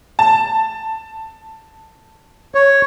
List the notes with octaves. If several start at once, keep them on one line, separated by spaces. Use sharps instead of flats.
A5
C#5